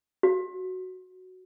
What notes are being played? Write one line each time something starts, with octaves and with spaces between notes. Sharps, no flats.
F#4